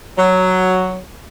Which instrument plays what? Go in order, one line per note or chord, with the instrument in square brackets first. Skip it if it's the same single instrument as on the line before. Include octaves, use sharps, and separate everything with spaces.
[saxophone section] F#3